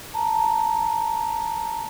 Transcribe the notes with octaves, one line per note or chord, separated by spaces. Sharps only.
A5 A#5